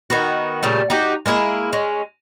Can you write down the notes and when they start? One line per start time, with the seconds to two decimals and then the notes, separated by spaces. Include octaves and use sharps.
0.10 D#3 B3 F#4
0.63 A#2 C#3 G3 A3
0.90 D#4 F#4 G4
1.26 G#3 A#3 E4 G#4
1.73 G#3 C#4